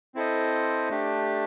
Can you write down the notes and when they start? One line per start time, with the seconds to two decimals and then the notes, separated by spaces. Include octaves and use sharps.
0.15 C4 E4 A4 C5 D#5
0.89 A3 D4 G4